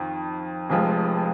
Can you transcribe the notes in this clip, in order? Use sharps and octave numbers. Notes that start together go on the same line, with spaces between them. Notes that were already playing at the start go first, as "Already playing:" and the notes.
Already playing: F2 D#3
F1 F2 F3 G#3